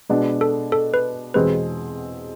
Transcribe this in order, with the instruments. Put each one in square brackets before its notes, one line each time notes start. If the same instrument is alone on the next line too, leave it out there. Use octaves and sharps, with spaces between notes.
[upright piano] B2 G#3 B3 D4
[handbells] A4
A4
B4
[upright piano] E2 B2 G#3 C4 G#4 [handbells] B4